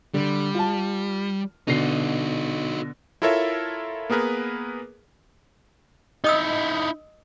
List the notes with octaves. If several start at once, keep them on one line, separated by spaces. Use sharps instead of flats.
D3 G3
F4 A5
B2 D3 D#4 F#4 C7
E4 F4 A4 A#4 C#5 E5
A#3 B3 G#4 A#4 B4
D#4 E4 D#5 D#6 E6